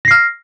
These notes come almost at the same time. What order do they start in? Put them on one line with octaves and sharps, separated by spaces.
A#6 C7 F6